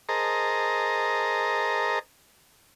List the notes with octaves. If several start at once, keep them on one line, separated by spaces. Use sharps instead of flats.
G#4 A#4 C5 D#5 A5 A#5